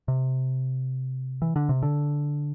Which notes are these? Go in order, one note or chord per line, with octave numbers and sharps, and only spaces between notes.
C3
E3
D3
C3
D3